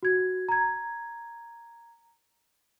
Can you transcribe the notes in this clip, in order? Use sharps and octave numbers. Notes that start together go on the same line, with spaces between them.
F#4 G#6
A#5 G#6